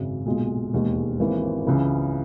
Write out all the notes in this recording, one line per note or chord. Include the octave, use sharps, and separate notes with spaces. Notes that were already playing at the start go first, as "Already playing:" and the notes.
Already playing: G#1 F#2 C#3
B1 A#2 G#3
E1 D#2 D#3 G#3
G#1 G#2 E3 A#3
C#2 C#3 E3